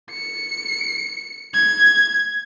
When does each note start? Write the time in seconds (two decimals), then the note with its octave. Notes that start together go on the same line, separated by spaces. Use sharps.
0.11 C#7
1.54 G#6